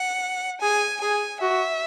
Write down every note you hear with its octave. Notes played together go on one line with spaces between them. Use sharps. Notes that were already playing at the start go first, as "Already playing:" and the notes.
Already playing: F#5
G#4 G#5
G#4 G#5
F#4 E5